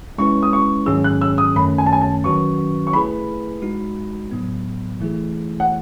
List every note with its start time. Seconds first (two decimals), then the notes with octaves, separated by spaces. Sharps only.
0.18 G#3 C#4 E4 B4 C#6
0.42 D#6
0.53 C#6
0.86 G#2 D#3 F#3 C#4 G#4 E6
1.04 F#6
1.21 E6
1.38 D#6
1.56 F#2 D#3 A3 C#4 B5
1.78 G#5
1.86 A5
1.93 G#5
2.01 A5
2.24 D#3 F#3 C#4 F#4 B4 C#6
2.87 C#6
2.93 A3 E4 G#4 B4 B5
3.62 G#3 D#4 F#4
4.31 A2 F#3 B3
5.01 E3 A3 E4 G#4
5.60 F#5